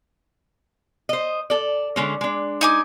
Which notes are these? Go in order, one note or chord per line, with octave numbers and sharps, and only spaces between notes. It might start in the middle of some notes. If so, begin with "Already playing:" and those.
C5 D#5
A4 D5
D3 G#3 C#4
G#3 D4
D#4 G#5 D6